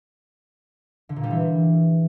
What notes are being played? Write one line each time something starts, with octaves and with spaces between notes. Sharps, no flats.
D3
A#2
G3
E3